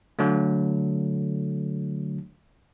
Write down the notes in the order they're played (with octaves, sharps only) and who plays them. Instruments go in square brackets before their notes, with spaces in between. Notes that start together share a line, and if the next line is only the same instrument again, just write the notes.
[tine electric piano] D3 F#3 A3